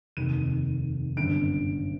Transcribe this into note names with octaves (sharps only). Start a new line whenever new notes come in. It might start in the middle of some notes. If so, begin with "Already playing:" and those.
F1 D#2 D#3 D#7
G1 F#2 D3 D7